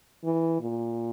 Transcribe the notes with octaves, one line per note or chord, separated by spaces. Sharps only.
E3
A#2